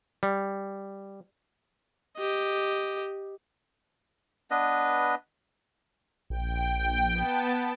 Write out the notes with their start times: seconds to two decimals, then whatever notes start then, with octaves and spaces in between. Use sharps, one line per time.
0.23 G3
2.17 G4 D#5
4.51 B3 D4 B4 D#5
6.30 A#1 G5 D7
7.12 B3 A5